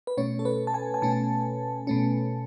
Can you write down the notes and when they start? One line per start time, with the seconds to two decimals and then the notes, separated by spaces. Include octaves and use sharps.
0.07 B4
0.17 B2 A3 C#4 C#5
0.39 A4
0.45 B4
0.67 A5
0.74 G#5
0.94 G#5
1.02 B2 A3 C#4 A5
1.87 B2 A3 C#4